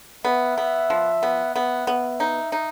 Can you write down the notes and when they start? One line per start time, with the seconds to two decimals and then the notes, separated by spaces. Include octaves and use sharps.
0.25 B3 E5
0.58 B3
0.90 F3
1.23 B3
1.55 B3 E5
1.87 B3
2.20 D#4
2.52 D#4